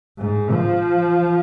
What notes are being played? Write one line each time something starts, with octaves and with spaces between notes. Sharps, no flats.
G#2
F3